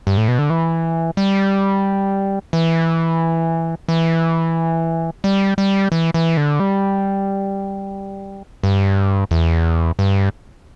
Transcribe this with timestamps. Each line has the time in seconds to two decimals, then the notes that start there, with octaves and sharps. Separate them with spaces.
0.07 G2
0.17 A2
0.28 B2
0.39 D3
0.50 E3
1.17 G3
2.53 E3
3.88 E3
5.24 G3
5.58 G3
5.92 E3
6.14 E3
6.37 D3
6.60 G3
8.63 G2
9.31 E2
9.99 G2